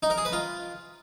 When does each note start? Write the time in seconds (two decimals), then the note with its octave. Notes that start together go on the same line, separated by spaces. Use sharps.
0.03 D#4
0.10 A#4
0.18 G#4
0.25 B4
0.33 F4